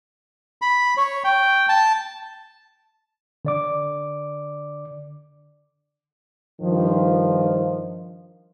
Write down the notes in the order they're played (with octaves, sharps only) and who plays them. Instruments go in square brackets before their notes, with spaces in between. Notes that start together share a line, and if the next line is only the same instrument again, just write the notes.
[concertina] B5
C#5
G5
A5
[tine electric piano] D3 D5 D6
[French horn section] G2 D#3 F3